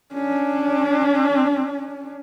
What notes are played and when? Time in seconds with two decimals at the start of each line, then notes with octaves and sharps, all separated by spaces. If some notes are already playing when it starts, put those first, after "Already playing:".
0.14 C#4 D4